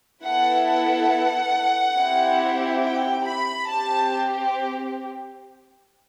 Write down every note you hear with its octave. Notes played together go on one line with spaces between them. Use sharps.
B3 E4 A4 F#5
F#5
C4 E4 G4
G5
B5
C4 G4 A5